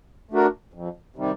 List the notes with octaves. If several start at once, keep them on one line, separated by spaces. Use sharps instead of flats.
A3 D4 F#4 A#4
F2
C3 D#3 G3